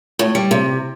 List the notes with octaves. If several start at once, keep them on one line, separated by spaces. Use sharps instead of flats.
A2
G3
C3